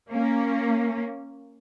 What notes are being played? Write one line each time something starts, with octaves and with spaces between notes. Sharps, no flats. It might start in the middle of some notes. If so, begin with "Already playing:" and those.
A#3 C#4